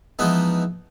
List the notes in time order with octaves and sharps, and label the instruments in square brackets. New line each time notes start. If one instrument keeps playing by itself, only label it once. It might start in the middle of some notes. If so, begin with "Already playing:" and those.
[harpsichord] E3 F3 G#3 B3 D#4